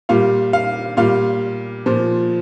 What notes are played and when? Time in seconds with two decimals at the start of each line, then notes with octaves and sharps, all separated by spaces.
0.09 A#2 G3 F5
0.53 F5
0.97 A#2 G3 F5
1.86 A#2 F3